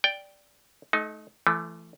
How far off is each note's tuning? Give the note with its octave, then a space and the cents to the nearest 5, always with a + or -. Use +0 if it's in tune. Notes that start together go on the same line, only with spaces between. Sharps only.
D5 -5 G5 +0
A3 -30 D#4 +10
E3 +35 A3 +0